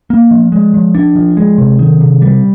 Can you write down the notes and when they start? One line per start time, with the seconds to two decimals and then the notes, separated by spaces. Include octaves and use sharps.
0.10 A#3
0.31 F3
0.52 G#3
0.74 F3
0.95 D4
1.15 F3
1.37 G#3
1.58 C3
1.79 D#3
2.00 C3
2.21 G3